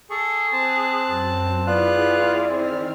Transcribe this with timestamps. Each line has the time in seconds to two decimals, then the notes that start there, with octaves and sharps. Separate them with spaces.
0.10 G#4 A4 C#6
0.53 C4 A5 F#6
1.07 F#2
1.67 B3 E4 F4 G#4 D5 F#6
2.50 D#3 C4 F6